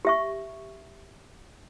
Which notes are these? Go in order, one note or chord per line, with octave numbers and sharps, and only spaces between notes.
G4 E5 C#6